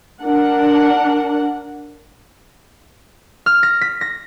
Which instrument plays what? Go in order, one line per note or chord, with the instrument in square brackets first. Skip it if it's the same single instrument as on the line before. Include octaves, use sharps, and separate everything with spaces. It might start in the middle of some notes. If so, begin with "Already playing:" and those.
[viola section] D4 A#4 F#5
[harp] F6
A#6
B6
A#6